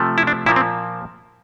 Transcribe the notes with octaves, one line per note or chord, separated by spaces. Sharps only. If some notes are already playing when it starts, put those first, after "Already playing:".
Already playing: C3 F3 A3
E4
D4
A#2 F3 A#3 E4
C4